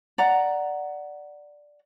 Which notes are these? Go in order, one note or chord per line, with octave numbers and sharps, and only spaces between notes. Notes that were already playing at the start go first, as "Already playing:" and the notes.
D5 F#5 A#5